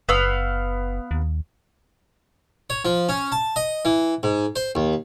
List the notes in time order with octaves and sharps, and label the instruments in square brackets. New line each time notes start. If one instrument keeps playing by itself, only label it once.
[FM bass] F#1 [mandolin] B3 F5 E6
[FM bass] D#2
[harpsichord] C#5
F3
C#4
A5
D#5
E3
G#2
C5
D#2